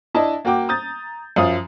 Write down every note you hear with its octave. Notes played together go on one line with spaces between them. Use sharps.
D4 E4 D#5 A5
A#3 F#4 G5 D6
A#5 D#6 G6 A6
F#2 F3 F5 D#6